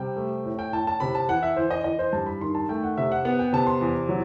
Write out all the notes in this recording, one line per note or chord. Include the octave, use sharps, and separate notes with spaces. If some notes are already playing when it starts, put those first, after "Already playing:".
Already playing: C3 G3 G5
A3
A2
G5
A2 A5
A5
C3 B5
A5
E3 F#5
E5
E3 C5
D#5
E3 D#5
C5
G2 A5
B5
D#3 C6
A5
A3 G5
F#5
C3 E5
F#5
B3 F#5
G5
C3 A5
C6
E2
F#3